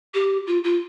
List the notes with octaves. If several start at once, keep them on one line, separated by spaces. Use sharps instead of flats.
G4
F4
F4